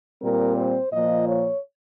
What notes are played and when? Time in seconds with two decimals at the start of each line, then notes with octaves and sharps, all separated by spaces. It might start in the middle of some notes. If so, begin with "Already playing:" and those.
0.21 A#2 G3 C4 A#4
0.56 C5
0.93 A#2 F3 A#3 D#5
1.28 C#5